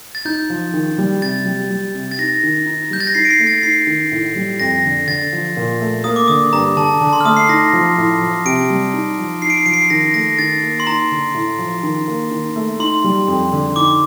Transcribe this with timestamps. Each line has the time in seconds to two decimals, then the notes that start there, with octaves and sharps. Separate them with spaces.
0.15 A6
0.25 D#4 G6
0.50 F3
0.74 D#3
0.98 G3
1.22 C3 A6
1.46 G3
1.70 G3
1.94 C3
2.12 A6
2.19 D#4 A#6
2.43 D#3
2.66 D#4
2.91 G3 G6
3.00 A6
3.07 A#6
3.15 D#4 C7
3.25 D7
3.30 C7
3.39 A3
3.47 A6
3.63 D#4 C7
3.87 D#3
4.11 A2
4.36 G3
4.60 F2 A#6
4.84 D3
5.07 D3 A6
5.32 F3
5.57 A#2
5.81 A3
6.04 A#3 D#6
6.16 D6
6.28 D3 D#6
6.53 G2 A#5
6.77 D3 A5
7.01 D3 A5
7.13 C6
7.21 F6
7.25 A3 D#6
7.37 C7
7.49 D#4 A#6
7.73 F3
7.98 A2
8.21 F3
8.45 C3 D7
8.70 G3
8.93 D#4
9.19 F3
9.42 D#4 C7
9.50 D7
9.58 C7
9.66 F3 D7
9.74 C7
9.90 D#3 A#6
10.14 A3 A#6
10.39 D#3 A6
10.63 A#3
10.80 C6
10.87 D#4 A#5
11.12 D3
11.35 A2
11.59 F3
11.83 D#3
12.08 A#3
12.31 D#3
12.56 A3
12.79 D#4 C6
13.04 G3
13.28 F2
13.53 D3
13.76 D#4 D6